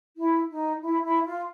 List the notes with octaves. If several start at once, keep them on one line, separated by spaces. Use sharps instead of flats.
E4
D#4
E4
E4
F4